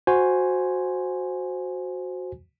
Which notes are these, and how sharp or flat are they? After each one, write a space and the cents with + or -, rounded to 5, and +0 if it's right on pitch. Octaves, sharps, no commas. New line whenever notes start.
F#4 -10 C5 +0 G#5 +0